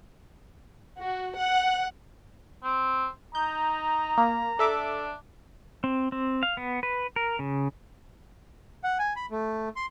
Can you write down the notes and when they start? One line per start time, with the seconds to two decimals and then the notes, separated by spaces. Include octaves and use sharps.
0.98 F#4
1.37 F#5
2.64 C4
3.35 D#4 A#5 G6
4.18 A#3
4.59 D4 A4 E5 D6
5.84 C4
6.12 C4
6.43 F5
6.57 B3
6.83 B4
7.16 A#4
7.39 C#3
8.84 F#5
8.99 G#5
9.16 B5
9.31 A3
9.76 C6